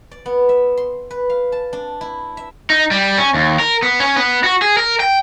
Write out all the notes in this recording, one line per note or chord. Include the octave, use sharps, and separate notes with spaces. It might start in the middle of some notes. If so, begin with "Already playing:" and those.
D5
B3
E5
C6
B4
F5
A5
D4
E4
E5
D#4
G3
C#4
D#2
A#4
B3
C#4
B3
F#4
G#4
A#4
G5